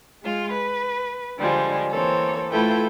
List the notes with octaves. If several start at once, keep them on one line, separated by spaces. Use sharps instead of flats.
G#3 F4
B4
D3 F3 G3 G#3
E3 A#3 C4 A4 C#5
A3 E4 F4 A4 B4 G5